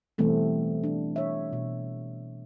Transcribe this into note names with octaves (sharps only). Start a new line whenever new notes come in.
B2 E3 G3 A3 B3 C4
D4
C#5 E5
B2